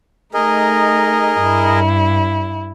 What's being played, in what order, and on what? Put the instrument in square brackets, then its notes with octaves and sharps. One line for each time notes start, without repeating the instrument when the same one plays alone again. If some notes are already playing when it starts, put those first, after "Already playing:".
[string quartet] A3 D#4 [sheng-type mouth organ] G#4 A#4 D#5
[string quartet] G2 E4